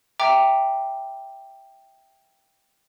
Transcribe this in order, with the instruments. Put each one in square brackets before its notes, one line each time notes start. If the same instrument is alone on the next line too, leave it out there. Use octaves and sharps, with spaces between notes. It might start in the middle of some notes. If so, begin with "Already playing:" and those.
[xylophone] E5 G5 A#5 D6